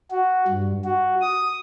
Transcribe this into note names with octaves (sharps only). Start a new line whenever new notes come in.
F#4
G2
F#4
D#6